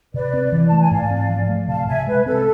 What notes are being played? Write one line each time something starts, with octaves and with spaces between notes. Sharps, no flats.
C3 B4 D5
C4
E3
A5
A3
G#5
G#2 D5 F5
C4
F3
A3
C3 F5 A5
C3 E5 G#5
G#3 B4
C4 A4